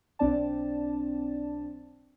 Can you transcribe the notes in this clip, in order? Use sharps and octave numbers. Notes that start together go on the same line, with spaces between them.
B1 C4 D4 D5 A5